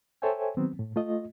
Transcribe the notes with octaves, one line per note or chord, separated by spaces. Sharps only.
A4 C5 C#5 E5 G5 G#5
D#3 F#3 B3 C4
A2
A3 F4 D#5